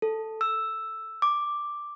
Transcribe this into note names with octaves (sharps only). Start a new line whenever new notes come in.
A4
E6
D6